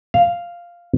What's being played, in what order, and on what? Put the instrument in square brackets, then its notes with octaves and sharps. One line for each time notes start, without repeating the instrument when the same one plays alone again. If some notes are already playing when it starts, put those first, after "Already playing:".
[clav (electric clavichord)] F5